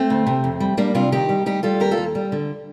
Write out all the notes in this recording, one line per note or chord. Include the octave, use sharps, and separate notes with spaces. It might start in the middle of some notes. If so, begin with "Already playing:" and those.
Already playing: A3 C4
D2
C3
F2
G3
G3 A#3 D4
C3 D4 F4
D#3 D#4 G4
G3
G3 D#4 G4
G3 F4 A4
D#2 G4 A#4
F4 A4
D#2
G3
D3